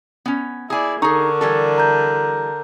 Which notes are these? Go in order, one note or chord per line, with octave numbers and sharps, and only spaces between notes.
B3 C#4
E4 G#4 D5 G#5
D3 D#4 G#4 A#4 C#6
E3 G3 A4
A#5 G6